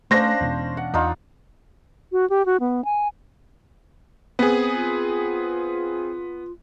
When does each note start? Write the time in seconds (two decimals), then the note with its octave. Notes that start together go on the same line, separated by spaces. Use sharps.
0.11 A3 C#4 D4 C5 F5 A#6
0.41 E1 E2
0.77 F#5
0.94 E2 D4 D#4 F4
2.12 F#4
2.30 G4
2.46 F#4
2.60 B3
2.85 G#5
4.39 B3 C4 G#4
4.73 F4